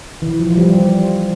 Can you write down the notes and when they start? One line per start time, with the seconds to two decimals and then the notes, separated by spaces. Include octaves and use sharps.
0.22 E3
0.40 F3
0.51 F3
0.57 G3
0.75 F3